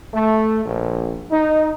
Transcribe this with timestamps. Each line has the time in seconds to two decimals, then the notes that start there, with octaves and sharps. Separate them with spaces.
0.14 A3
0.66 A#1
1.31 D#4